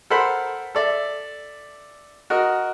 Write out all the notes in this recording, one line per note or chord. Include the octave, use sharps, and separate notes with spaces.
A4 A#4 C5 F#5 B5
A4 D5 E5
F#4 A#4 D#5